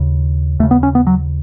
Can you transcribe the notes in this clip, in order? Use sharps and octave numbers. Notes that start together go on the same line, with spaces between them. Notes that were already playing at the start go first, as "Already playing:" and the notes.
Already playing: D#2 C#3
D#2 C#3 A3
B3
C#4
B3
F#3